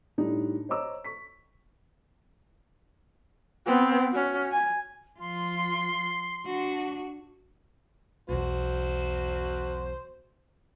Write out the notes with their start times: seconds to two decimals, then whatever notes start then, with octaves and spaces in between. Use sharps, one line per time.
0.18 A2 G3 D4 D#4
0.69 C5 C#5 D#5 A#5 D6 E6
1.04 C#6 B6
3.66 B3 C4
4.11 C#4 F#4
4.52 G#5
5.20 F3 F4 C6
6.46 D4 F#4
8.29 B1 E2 F#4 C5